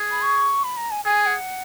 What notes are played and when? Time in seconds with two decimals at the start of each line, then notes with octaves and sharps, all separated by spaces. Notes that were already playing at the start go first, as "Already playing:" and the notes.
Already playing: G#4
0.11 B5
0.22 C#6
0.64 B5
0.77 A#5
0.91 G#5
1.05 G#4 G#5
1.26 F#5